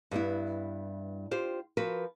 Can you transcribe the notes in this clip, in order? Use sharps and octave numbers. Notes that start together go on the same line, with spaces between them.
G2 G3 B3 E4
F4 G4 C5
F3 F#4 A#4 B4